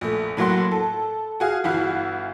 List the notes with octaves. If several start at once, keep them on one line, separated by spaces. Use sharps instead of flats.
A#1 A3
A2 F#3 A#3 F#5 C6
A4
F#4 G#4 F5
G1 E3 E4 F#4 F5